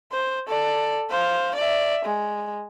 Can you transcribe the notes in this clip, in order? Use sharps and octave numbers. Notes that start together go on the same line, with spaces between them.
C5
A4 D5
C5 F5
D5 E5
G#3